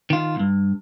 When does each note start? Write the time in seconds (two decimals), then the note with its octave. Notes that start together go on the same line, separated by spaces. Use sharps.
0.10 D#3 F4
0.36 C2 G2